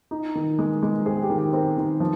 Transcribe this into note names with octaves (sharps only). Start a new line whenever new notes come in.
D#4
D#3
G#3
G#3
C4 G#4
G4
D#3
G4
C4 A#4
D#3
F3